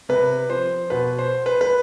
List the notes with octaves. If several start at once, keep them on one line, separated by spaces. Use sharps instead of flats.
C3 B4
F3 C5
B2 B4
C5
B4
B4